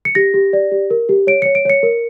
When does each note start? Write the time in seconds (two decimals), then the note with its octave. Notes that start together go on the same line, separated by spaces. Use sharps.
0.05 C#7
0.15 G4 A#6
0.34 G4
0.53 D5
0.71 G4
0.90 A#4
1.09 G4
1.27 C#5 D7
1.42 C#5 C#7
1.55 D7
1.65 C#5 C#7
1.83 A#4